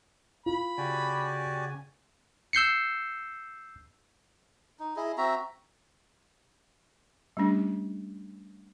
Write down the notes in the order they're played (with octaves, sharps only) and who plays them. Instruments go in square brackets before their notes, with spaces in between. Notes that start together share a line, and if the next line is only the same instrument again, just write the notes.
[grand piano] F4 [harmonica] B5
[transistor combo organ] C#3 G#5 [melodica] F#4 G4 D5
[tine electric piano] E6 G6 C7 C#7
[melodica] D#4
E4 G#4 D#5
C4 F#4 E5 A#5
[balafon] G3 A3 C#4 D4 G4